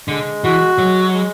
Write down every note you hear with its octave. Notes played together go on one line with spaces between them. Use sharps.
D3 G#3
E3 F#4
F#3 G#3
G#3